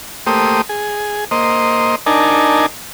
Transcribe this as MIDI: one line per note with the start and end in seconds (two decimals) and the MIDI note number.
0.27 0.62 57
0.27 0.62 58
0.27 0.62 67
0.27 0.62 72
0.27 0.62 87
0.69 1.24 68
1.31 1.96 58
1.31 1.96 72
1.31 1.96 75
2.06 2.66 62
2.06 2.66 63
2.06 2.66 70
2.06 2.66 80
2.06 2.66 81